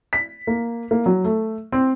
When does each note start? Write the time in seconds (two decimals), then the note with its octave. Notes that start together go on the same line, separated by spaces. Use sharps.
0.13 B6
0.47 A#3
0.91 A#3
1.06 F#3
1.24 A3
1.72 C4